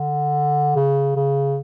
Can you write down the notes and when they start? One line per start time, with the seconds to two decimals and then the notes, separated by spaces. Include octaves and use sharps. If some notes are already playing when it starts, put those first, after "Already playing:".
Already playing: D3
0.76 C#3
1.16 C#3